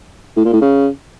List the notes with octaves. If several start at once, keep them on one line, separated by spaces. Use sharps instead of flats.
A2
A#2
A2
C#3